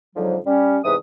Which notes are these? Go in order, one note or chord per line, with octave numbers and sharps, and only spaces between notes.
F2 G#2 D3 F3 F#3
G3 C#4
E2 G#2 C3 E3 B4 D#6